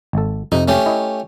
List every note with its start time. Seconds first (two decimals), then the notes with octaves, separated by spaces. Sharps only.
0.13 G#1 A4
0.52 F2 C3 D#4
0.68 A3 C#4 G4
0.86 E4 D#5